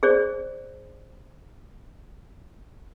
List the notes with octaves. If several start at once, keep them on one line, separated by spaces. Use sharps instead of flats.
G#4 C5 D5